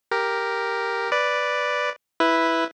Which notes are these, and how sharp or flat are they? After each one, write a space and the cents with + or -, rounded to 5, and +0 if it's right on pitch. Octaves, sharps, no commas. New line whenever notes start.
G4 +0 A#4 +0
B4 +0 D5 +0
E4 +0 B4 +0